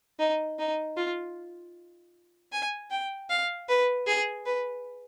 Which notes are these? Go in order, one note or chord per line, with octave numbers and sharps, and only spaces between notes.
D#4
D#4
F4
G#5
G5
F5
B4
G#4
B4